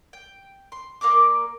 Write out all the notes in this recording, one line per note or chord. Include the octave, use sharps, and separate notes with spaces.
G5
C6
A#3 A#4 D5 D6